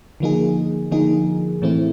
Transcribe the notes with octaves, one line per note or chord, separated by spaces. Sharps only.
D3 F3 A#3 D#4 G#4
D3 F3 A#3 D#4 G#4
A2 E3 A3 C4 E4